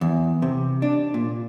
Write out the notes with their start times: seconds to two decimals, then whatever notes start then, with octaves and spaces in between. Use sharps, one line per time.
0.01 E2
0.42 C3
0.82 D4
1.14 A#2